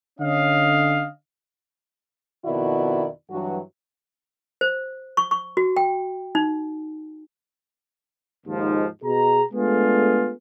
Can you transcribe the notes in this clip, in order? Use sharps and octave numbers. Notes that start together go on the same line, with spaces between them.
D3 C#4 D#5 F5
F2 B2 D#3 E4 F#4 D5
G2 E3 F#3 F#4
C5
C#6
C#6
F#4
G5
D#4
D#2 G#2 F3
B2 G#4 A#5
G#3 A3 B3 D4 F4 G#4